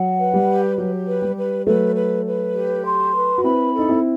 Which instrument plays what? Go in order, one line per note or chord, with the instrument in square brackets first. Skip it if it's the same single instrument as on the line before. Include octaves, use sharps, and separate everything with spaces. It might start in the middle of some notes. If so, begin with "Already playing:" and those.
Already playing: [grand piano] F#3 [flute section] F#5
[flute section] B4
[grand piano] G3
[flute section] G4
[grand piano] F#3 [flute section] G4
[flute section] B4
[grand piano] G3
[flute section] B4
[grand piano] F#3 A3 [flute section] B4
[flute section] B4
B4
G4
C6
B4
[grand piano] F#4
[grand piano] C4 E4 [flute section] B5
[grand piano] D#4 [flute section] A4
[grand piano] C4 E4